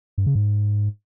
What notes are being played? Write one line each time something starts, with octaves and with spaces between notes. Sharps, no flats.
G2
C#3
G#2